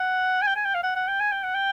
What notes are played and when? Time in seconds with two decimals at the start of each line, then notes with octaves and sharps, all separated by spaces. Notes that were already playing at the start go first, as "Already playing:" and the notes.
Already playing: F#5
0.42 G#5
0.47 G5
0.56 G#5
0.65 G5
0.74 F5
0.83 F#5
0.96 F#5
1.08 G5
1.20 G#5
1.32 G5
1.43 F#5
1.54 G5